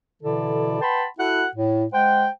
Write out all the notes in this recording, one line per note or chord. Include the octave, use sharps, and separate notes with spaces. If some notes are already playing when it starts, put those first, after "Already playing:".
B2 D3 E3 E4 A4 D5
B4 F#5 G5 A5 B5 C6
E4 F#4 A4 F#5
A2
G#3 C5 F#5 G5